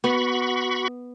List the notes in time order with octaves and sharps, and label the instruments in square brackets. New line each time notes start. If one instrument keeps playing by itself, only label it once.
[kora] B3 [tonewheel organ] F#4 B5 C#6